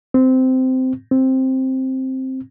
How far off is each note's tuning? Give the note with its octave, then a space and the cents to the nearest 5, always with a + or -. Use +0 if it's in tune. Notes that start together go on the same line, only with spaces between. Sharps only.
C4 -15
C4 +5